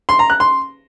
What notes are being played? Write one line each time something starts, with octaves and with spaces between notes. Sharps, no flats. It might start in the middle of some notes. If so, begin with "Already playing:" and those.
C6
A#5
F#6
C6